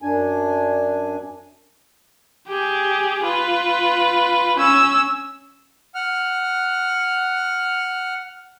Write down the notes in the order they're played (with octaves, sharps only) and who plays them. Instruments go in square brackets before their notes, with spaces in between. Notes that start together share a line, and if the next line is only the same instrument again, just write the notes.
[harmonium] F#2 D4 G#5
[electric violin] G4 G#4
F4 B4
C#4 E6
[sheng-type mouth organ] F#5 F6